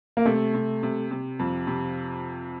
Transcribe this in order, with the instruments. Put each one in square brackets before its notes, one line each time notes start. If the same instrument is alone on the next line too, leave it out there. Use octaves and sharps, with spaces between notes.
[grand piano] A#3
[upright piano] C3 [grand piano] A3
[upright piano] C3
C3
C3
F2
C3